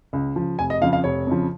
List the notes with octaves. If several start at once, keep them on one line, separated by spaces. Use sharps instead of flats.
C#2
C#3 F3
F1 G#5
D#5
F2 C#3 F3 F5
F5
F1 C#5
F2 C#3 F3